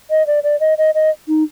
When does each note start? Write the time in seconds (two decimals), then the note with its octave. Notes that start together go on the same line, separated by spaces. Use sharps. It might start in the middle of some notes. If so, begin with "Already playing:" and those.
0.10 D#5
0.27 D5
0.44 D5
0.60 D#5
0.78 D#5
0.95 D#5
1.28 D#4